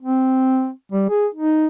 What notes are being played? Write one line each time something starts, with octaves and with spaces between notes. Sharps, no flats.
C4
G3
G#4
D#4